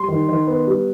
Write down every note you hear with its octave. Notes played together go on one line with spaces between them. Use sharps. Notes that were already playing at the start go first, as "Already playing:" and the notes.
Already playing: G3 C6
D#3
D#3
B3
G3